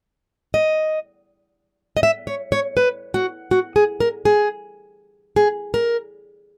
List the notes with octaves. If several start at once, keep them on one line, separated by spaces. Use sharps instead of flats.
D#5
D#5
E5
C#5
C#5
B4
F#4
F#4
G#4
A#4
G#4
G#4
A#4